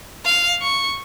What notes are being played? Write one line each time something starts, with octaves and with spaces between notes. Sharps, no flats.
F5
C#6